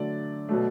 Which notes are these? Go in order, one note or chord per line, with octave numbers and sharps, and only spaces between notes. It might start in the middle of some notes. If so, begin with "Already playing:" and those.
Already playing: D3 F#3 A3 D5
B2 F#3 A3